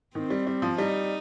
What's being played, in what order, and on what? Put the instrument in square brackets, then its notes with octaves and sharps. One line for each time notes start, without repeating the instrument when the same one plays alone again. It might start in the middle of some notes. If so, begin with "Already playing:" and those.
[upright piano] D#3 [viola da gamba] C4
[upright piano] G3
G3
F3
[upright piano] G3 [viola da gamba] D#4